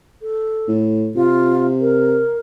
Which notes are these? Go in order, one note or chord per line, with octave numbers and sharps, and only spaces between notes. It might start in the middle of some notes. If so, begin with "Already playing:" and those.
A4
A2
C3 F4
A#4